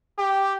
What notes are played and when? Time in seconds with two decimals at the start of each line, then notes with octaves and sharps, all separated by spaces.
0.18 G4